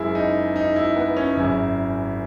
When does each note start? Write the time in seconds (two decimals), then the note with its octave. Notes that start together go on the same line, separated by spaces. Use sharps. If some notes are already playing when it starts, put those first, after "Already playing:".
Already playing: F#1 F#2 C#3 G#3 E4
0.15 D#4
0.56 D#4
0.76 E4
0.96 B3
1.16 C#4
1.37 G#1 F#2 C#3 E4